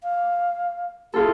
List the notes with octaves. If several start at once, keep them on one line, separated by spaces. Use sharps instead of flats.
F5
E4 F4 G#4 A4